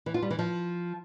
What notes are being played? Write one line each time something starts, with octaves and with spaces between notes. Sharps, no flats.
E3
F4
G3
E3
F3